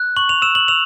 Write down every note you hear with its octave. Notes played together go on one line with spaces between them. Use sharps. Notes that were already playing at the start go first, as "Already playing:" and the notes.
Already playing: F#6
C#6 F#7
F7
E6 E7
F#7
E6 F7